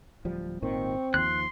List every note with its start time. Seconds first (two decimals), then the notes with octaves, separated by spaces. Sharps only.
0.25 D1 F3 G3
0.62 G#1 A#2 D#3 C4 C#6
1.14 D#2 F3 C6 F#6